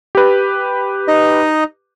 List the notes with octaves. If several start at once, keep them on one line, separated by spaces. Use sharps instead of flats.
G4 B4
D#4 D#5